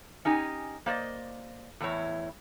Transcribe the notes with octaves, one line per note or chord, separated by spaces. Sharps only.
C#4 D#4 G4 G#5
A#3 C5 D5 D#5
E2 A2 E4 C#5